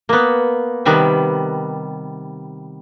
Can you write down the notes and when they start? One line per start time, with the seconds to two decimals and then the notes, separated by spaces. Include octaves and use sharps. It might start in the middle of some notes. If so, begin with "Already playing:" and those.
0.09 A#3 B3
0.85 C3 D#3 G3 B3